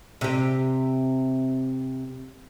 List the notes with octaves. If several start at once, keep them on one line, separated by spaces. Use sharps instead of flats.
C3 G4